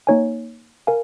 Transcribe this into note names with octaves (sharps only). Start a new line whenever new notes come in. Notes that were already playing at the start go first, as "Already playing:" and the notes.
A#3 D#4 C#5 G#5
A#4 F5 G#5